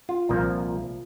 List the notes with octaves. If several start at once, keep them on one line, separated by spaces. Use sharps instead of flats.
F4
C2 A#2 F3 A#3